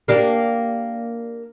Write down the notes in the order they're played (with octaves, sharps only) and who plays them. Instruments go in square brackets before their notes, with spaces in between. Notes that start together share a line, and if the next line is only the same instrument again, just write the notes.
[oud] A#3 D4 G4